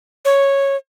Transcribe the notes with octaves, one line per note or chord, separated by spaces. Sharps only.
C#5